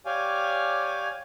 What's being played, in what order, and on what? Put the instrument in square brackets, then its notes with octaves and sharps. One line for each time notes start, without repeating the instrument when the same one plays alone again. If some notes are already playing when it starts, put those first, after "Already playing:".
[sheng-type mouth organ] G4 C#5 D5 F5 G#5